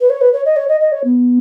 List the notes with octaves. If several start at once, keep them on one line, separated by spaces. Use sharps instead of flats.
B4
C#5
B4
C#5
D#5
C#5
D#5
D#5
C#5
B3